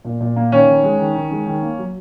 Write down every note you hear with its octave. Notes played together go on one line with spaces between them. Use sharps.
A#2
A#2
A#3
D#3 C#4
D#3
G#3
D#3
D#3
G#3
D#3
A#3
F#3